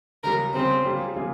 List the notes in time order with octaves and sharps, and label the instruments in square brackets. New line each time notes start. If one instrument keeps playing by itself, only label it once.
[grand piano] C#2 C#3 G3 [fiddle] A#4
[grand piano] C#2 C#3 G3 [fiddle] C4
[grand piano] C#3 G3 A#3 F4 G#4
C#3 G3 A#3 F4 G#4